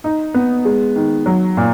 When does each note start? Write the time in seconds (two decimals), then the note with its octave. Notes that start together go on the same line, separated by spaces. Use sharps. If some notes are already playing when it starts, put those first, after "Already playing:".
0.04 D#4
0.34 B3
0.65 G#3
0.96 D#3
1.26 F#3
1.57 A#2